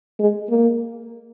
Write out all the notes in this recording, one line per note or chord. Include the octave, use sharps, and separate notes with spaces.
G#3
A#3